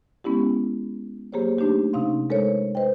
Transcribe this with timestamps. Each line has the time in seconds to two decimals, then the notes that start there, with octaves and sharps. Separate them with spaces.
0.24 G#3 B3 C#4 E4 G4
1.33 F#3 A#3 G4 G#4 C5 C#5
1.57 A3 D4 D#4 G4 G#4
1.93 C3 C#4 D#4 F5 C6
2.30 G#3 A4 A#4 C5 C#5
2.75 B4 C5 D#5 G5